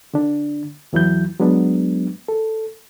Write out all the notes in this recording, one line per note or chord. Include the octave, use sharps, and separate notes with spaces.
D3 D4
E2 E3 F#3 E4 G6
F#3 G#3 B3 D4
A4